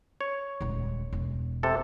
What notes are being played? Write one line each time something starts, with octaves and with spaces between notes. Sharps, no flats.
C#5
D#1 C#2
E1
C3 A4